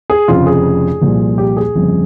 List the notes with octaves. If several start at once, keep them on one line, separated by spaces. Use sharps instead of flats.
G#4
F1 F2 C#3 F3 F4
G#4
C2 A#2 F3
G4
G#4
G1 F2 C#3 F3